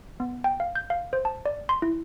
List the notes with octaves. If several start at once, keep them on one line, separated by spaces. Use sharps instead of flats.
B3
G5
F5
G6
F5
C5
A5
D5
C6
E4